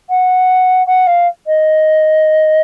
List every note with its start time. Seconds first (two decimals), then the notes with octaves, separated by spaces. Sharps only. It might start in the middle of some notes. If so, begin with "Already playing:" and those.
0.09 F#5
0.87 F#5
1.06 F5
1.47 D#5